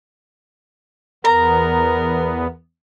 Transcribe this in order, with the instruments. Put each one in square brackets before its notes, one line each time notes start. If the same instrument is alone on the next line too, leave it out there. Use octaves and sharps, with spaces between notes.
[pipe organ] E2 B3 [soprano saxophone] A#4 [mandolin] A#5